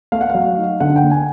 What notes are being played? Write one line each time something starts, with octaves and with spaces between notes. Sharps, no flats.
A3 F5
F#5
F5
F#3
D#4
D3 F#5
G5
A#3
G#5